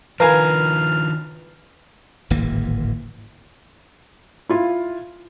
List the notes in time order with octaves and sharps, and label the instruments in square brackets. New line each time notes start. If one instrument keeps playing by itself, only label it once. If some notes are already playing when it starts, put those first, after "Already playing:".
[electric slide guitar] D#3 F3 [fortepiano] A#4 F5 G#5 [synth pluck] B4 [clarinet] F6
[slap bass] D1 G#1 E3 A#3
[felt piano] E4 F4